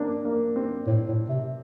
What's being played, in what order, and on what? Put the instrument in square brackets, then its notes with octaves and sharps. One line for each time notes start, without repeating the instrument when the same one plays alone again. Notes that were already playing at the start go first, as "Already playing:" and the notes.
Already playing: [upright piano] A#3 C4 D4
A#3
C4
[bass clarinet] A2
A2
C3